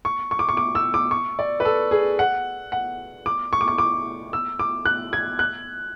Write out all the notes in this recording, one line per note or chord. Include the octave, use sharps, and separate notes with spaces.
C#6
C#6
D6
C#6
D6
E6
D6
C#6
D5
B4
A4
G#4
F#5
F#5
D6
C#6
D6
C#6
D6
E6
D6
F#6
G#6
F#6